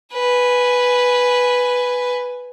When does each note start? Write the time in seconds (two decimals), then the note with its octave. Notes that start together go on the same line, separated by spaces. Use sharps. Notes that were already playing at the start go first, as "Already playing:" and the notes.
0.13 B4 G#5